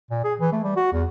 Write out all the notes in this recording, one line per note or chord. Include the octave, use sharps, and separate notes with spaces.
A#2
G#4
E3
A3
G3
F#4
E2